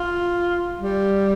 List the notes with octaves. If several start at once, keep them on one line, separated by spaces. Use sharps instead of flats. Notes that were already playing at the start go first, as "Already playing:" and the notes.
Already playing: F4
G3